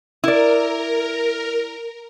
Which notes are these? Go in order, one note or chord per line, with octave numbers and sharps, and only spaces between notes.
E4 A#4 D5